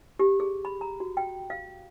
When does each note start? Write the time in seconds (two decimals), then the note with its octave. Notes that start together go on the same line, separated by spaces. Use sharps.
0.19 G4
0.40 G#4
0.65 B5
0.81 A#5
1.00 F#4
1.17 G5
1.50 F5